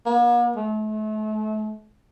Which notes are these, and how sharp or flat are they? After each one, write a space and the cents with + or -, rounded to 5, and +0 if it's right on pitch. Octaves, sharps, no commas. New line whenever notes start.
A#3 +45
A3 -35